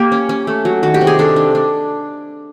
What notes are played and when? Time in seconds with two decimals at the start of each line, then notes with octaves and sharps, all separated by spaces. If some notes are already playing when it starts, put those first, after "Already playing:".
Already playing: A#3 G4
0.12 C#4
0.29 C#4
0.47 A3
0.65 F#3
0.83 D#3 F#4
0.94 G4
1.01 C3
1.07 G#4
1.19 D4 A4
1.36 D4
1.55 D4